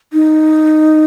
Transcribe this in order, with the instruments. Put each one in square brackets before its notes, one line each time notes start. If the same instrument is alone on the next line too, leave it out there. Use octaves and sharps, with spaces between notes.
[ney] D#4